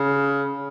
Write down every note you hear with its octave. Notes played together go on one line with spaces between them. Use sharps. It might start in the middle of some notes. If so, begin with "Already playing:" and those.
Already playing: C#3